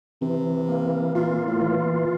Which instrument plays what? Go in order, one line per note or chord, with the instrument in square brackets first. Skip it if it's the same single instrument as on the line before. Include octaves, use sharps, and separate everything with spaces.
[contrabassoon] C3 [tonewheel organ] E3
[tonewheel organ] A#3
[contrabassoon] A#2 [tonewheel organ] F4
[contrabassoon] A2
[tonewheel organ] E3
[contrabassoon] A#2